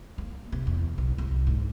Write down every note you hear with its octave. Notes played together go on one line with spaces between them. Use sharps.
A#3
C3
E2
B1
C2
G#2